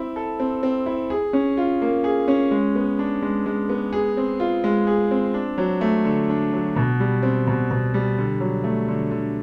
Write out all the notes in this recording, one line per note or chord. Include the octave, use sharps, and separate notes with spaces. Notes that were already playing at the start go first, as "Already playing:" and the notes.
Already playing: C4 E4
A4
C4
C4
E4
G#4
C#4
F4
A#3
G#4
C#4
G#3
B3
D4
G#3
G#3
B3
G#4
C4
F4
G#3
G#4
C4
D4
F#3
A3
D3
D4
F#3
B2
G3
C4
B2
B2
G3
D3
F#3
A3
D3
D3